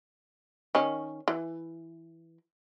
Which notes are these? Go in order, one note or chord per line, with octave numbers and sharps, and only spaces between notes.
D#3 C#4
E3